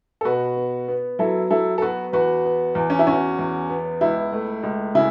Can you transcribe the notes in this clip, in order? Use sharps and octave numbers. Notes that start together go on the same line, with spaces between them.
A4
B2 F#4 B4
B3
B3
F#3 E4 A4
F#3 E4 A4
A4
B3 F#4 B4
E2 F#4 B4
B3
E2
C#4
E4
E2 C#4 F#4
E2
B3
C#2 E4
A3
C#2
C#3 E4